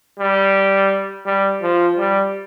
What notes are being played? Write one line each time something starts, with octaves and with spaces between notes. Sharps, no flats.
G3
G3
F3
G3